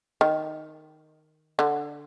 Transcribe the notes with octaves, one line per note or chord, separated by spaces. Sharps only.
D#3
D3